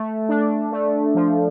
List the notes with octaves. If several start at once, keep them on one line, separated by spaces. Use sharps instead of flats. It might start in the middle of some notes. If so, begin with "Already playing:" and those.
Already playing: A3
D4
A3
F3